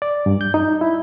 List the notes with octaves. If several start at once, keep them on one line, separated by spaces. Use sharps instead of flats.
D5
G2
G6
D#4
E4